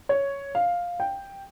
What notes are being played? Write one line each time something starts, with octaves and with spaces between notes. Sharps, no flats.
C#5
F5
G5